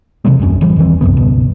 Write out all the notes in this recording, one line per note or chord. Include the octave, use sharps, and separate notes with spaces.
C3 E3 F#3 G#3
D#1 A#1 F#2 C#4
A1 E3 F3 G3
E1 D#3 E3 C4
C2 F#2 C3 B3
G1 C#2 B2